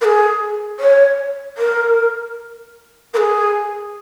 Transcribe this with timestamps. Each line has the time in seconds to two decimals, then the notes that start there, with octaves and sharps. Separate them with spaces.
0.01 A#4
0.04 G#4
0.79 C#5
1.57 A#4
3.13 A#4
3.17 G#4